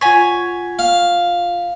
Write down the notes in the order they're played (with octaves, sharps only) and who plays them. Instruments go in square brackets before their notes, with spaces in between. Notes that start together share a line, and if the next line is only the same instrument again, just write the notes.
[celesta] F4 F#5 B6 [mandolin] C#5 G#5
[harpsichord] F5